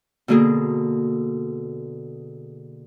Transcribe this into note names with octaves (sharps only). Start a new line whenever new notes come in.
B2 D3 A#3 D4 G#4